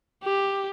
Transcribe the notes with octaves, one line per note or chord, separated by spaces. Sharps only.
G4